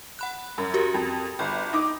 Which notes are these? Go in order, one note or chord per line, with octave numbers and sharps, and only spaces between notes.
F#5 B5 F#6
F#2
F#4 G4 A#4
F2
G1 G5
D#4 D6